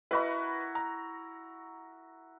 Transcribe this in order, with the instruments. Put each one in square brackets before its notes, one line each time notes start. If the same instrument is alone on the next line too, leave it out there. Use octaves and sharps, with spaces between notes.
[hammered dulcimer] E4 F#4 A#4 [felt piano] B4 D#5 B5
[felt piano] A#5